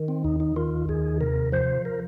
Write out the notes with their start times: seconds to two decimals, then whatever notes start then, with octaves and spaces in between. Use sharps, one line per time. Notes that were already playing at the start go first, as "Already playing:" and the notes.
Already playing: D#3
0.08 C4
0.24 D#2 D#4
0.40 D#4
0.56 D#3 F4
0.89 D#2 G#4
1.20 C3 A#4
1.52 F3 C5
1.85 A#4